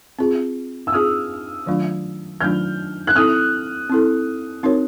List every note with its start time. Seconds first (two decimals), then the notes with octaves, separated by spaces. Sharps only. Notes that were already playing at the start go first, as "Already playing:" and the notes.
0.19 C4 F4 G#4
0.87 E6
0.92 C4 F4 G#4 D#6 F6
1.66 D#3 F#3 A3 D4 F4
2.40 D#3 F#3 A3 D4 F4 F6 G6
3.07 F#6
3.15 C4 E4 A4 D#6 F6
3.90 C4 E4 A4
4.63 C4 D#4 F#4 A#4 C#5